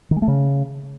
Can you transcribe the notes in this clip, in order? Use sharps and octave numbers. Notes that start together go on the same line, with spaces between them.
D#3
G#3
A3
C#3